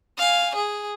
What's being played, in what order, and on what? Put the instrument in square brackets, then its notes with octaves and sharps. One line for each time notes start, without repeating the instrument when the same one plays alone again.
[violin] F5 G#5
G#4